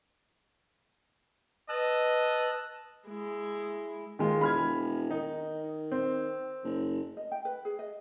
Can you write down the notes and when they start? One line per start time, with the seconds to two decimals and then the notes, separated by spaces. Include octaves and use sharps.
1.69 B4 D#5 A5 E6 F#6
3.09 G#3 E4
4.19 D#2 D#3 G#3 F4
4.41 E1 B5 F6 G#6
5.11 D#3 D#4
5.92 C4
6.64 F#1
7.17 D#5
7.32 G5
7.45 B4
7.65 G#4
7.79 D#5